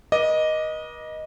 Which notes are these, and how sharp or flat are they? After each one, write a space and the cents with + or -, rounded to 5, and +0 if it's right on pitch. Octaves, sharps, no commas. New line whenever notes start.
B4 -45 D#5 +0 D6 +0